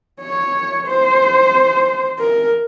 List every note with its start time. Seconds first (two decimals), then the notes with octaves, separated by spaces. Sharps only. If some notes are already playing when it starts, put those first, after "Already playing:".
0.21 C#5
0.87 C5
2.19 A#4